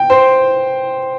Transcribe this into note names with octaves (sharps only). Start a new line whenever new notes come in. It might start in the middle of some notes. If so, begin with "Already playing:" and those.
Already playing: G5
C5